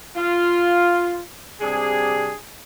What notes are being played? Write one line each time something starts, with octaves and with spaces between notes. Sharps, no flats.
F4
C3 G3 D4 G#4